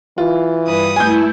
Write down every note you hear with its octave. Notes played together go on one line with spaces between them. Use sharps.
E3 F4
G2 B4 D#6
A3 E4 G#5 G6